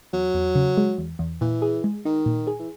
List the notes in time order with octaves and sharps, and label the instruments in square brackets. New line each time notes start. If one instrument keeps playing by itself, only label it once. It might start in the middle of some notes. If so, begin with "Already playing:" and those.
[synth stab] E2 [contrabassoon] F#3
[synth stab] E2
C#3
G#3
E2
E2
[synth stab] A#2 [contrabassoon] E3
[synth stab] G#4
G#3
[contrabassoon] D#3 [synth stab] D#4
[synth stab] A#2
G#4
[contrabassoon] E3